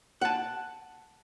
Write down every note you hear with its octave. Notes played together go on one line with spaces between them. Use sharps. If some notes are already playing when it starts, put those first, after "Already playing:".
F#5 A5